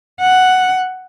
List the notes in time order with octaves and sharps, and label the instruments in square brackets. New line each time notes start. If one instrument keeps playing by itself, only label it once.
[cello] F#5